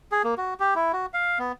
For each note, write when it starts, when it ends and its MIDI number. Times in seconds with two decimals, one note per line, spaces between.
0.12 0.22 68
0.24 0.34 58
0.38 0.54 66
0.60 0.74 67
0.75 0.92 64
0.93 1.06 66
1.14 1.38 77
1.39 1.52 59